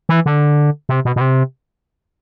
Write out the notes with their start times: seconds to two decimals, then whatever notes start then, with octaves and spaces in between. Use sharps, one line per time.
0.09 E3
0.26 D3
0.89 C3
1.05 B2
1.16 B2
1.21 C3